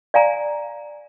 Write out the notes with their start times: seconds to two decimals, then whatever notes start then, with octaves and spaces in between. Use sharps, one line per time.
0.14 D5 F5 G#5 A#5